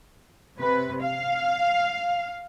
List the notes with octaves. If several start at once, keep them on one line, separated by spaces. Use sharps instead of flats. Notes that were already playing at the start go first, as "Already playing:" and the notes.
C3 B4
F5